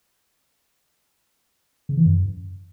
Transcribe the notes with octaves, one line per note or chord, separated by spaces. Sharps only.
C#3
E3
F#2